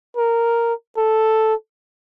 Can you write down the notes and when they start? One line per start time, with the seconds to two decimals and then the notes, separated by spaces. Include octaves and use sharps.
0.17 A#4
0.98 A4